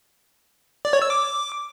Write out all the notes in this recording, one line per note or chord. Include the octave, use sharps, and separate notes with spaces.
D5
C#5
E6
D6